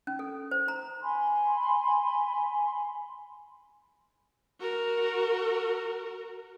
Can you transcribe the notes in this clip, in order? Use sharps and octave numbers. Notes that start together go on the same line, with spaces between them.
C#4
A4
C5
A#5
G#5 B5 C6
F#4 A#4